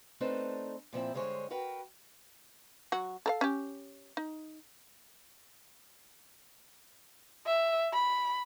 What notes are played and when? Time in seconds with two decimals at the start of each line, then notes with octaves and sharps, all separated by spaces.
0.20 A3 C4 D4 D#4 A4 B4
0.93 A#2 F3 C4 E4
1.14 G2 D3 G#3 C5 C#5 G#5
1.50 F#4 A#4 B4 F#5 G5
2.92 F#3 F#4
3.26 A4 A#4 F5
3.41 C#4 G4
4.17 D#4
7.46 E5
7.93 B5